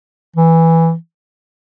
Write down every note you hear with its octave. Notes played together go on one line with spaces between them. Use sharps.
E3